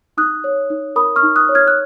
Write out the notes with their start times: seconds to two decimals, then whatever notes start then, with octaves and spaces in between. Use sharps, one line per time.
0.17 D#4 D#6 F#6
0.44 C#5
0.70 D#4
0.96 A#4 B5 D#6
1.16 C#6 F6
1.23 D#4
1.36 D#6 F#6
1.49 C#5
1.55 F6 G#6
1.68 F#6